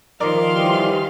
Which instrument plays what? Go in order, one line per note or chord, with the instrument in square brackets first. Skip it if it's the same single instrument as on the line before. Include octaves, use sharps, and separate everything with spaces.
[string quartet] D#3 F5 C6 [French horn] F3 [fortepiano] A#4 D5
[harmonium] E3 G3 G4